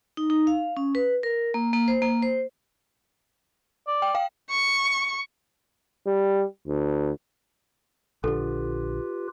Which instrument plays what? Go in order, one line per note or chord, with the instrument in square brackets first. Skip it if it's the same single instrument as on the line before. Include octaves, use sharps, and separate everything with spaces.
[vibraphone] D#4
D#4
F5
C#4
B4
A#4
A#3
A#3
C5
A#3
C5
[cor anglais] D5
[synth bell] G5
F5 G5
[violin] C#6
[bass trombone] G3
D2
[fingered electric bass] A#1 D3 [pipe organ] F4 G4 B4 [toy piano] A4